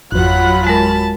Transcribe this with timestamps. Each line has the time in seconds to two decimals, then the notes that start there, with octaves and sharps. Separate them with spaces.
0.12 G#1 F2 F#3 F4 F#5 B5 F#6
0.67 G#3 A#4 A5